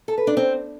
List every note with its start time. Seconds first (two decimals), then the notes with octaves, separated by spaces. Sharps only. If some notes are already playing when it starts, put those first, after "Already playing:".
0.08 A4
0.18 B4
0.27 D4
0.37 C4